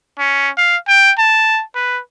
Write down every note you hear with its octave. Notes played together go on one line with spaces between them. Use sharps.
C#4
F5
G5
A5
B4